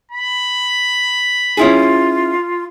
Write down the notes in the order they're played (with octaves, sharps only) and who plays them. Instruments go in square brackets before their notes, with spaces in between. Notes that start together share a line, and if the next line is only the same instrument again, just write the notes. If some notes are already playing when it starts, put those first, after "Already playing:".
[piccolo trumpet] B5
[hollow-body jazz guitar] C#4 E4 G#4 [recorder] F4